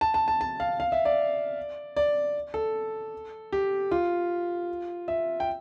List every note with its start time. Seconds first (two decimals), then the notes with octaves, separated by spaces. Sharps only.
0.01 A5
0.14 A5
0.28 A5
0.41 A5
0.60 F5
0.80 F5
0.92 E5
1.05 D5
1.97 D5
2.54 A4
3.52 G4
3.91 F4
5.08 E5
5.40 G5